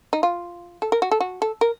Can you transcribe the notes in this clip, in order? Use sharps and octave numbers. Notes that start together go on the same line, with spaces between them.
D#4
F4
A4
A#4
F#4
A4
F#4
A4
A#4